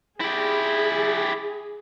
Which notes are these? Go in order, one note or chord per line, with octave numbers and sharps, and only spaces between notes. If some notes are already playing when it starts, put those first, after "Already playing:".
E4 G4 G#4